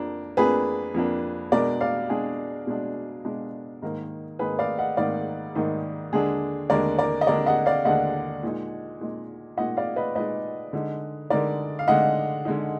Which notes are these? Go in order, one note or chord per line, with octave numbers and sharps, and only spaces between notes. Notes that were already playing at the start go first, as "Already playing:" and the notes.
Already playing: F2 F3 A#3 D4 A#4
F2 F3 A#3 D4 G#4 B4
F2 F3 A#3 D4
B2 G#3 D4 A#4 D5
D5 F5
B2 G#3 D4 G#4
B2 G#3 D4
B2 G#3 D4
G#2 D#3 A#3 D#4 A#4
G#2 D#3 A#3 D#4 G#4 B4
D5 F5
D#5 F#5
G#2 D#3 A#3 D#4 D5 F5
G#2 D#3 A#3 D#4
D#2 D3 G#3 D4 G#4
D#2 D3 G#3 D4 A#4 D5
A#4 D5
D#5
D#2 D3 G#3 D4 A#4 D5
D#5 F#5
D5 F5
D#2 D3 G#3 D4 D#5 F#5
A#2 G#3 D#4
A#2 G#3 D#4
A#2 G#3 D#4 D#5 F#5
D5 F5
B4 D#5
A#2 G#3 D#4 B4 D#5
D3 G#3 D#4
D3 G#3 D#4 A#4 D5
F5
D3 G#3 D#4 D#5 F#5
D3 G#3 D#4